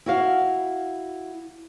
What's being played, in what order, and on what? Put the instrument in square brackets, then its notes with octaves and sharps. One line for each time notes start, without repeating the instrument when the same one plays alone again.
[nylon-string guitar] E4 F#4 F5